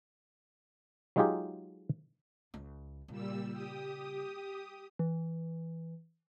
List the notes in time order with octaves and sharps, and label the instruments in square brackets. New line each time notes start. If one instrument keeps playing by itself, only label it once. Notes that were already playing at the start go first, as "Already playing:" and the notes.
[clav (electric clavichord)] F#3 G#3 D#4 F4 G4 G#4
[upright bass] C#2
[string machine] A#2 G3 E6 [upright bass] C#3
[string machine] G4 D#6
[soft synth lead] E3